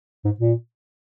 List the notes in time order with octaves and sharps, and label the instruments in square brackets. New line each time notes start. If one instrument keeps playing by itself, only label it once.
[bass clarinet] G#2
A#2